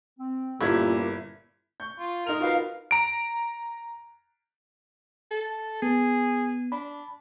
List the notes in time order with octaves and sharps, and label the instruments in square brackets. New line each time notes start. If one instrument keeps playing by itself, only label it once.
[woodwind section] C4
[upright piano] G1 E4 G#6 [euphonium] A#2 [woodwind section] C#4 F4 G4
[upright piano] C#6 G6
[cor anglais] F4
[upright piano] D#4 F7 [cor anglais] A#4
[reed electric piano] F4 F#4 B4 [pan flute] F5
[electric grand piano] A#5 D7
[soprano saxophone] A4
[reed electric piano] B3 [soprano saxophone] G#4
[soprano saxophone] D4 [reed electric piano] B5